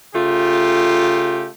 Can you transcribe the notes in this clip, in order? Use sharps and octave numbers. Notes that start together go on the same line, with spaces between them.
C#3 A3 F4 G4